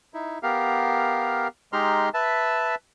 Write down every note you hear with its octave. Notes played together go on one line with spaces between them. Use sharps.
D#4 E4
B3 G4 A#4 F5
G#3 D#4 G4 A#5 C6 F6
B4 E5 A5